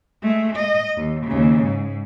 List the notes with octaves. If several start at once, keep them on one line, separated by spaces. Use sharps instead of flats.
G#3 A3
D#5
D#2
D#2 C#3
G#2